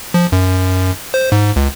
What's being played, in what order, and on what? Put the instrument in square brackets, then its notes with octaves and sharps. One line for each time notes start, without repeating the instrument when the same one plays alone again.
[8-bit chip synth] F3
F#2
C5
G#2
C#2